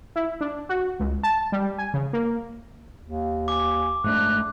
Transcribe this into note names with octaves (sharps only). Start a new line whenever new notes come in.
E4
D4
F#4
C#2
A5
G3
G#5
C#3
A#3
D#2
G#5 D6
G#2 A3 D4 F#6